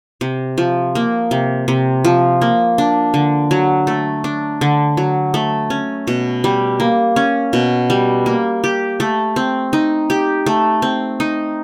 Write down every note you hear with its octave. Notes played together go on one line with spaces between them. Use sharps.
C3
F3
A#3
C3
C3
F3
A#3
D4
D3
F#3
A3
D4
D3
F#3
A3
C#4
B2
G3
A#3
C#4
B2
G3
A#3
G4
A3
C4
D#4
G4
A3
C4
D#4